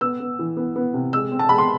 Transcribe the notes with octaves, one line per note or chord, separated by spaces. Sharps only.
B3 E6
B3
E3
B3
B3
C3
G#3 E6
C4
A5
G#3 B5
C6